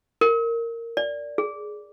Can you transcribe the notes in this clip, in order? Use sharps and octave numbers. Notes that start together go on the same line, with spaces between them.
A#4
D5
G#4